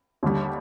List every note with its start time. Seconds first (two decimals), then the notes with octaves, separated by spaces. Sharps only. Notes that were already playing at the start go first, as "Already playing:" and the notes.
0.23 D#2 D3 G3